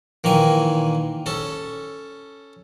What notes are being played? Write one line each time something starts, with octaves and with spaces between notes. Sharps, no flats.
A#2 D#3 E3 G#5
C#4 A4